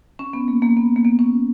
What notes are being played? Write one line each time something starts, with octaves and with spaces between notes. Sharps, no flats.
C#4
B3
A#3
A#3
B3
A#3
B3
C#4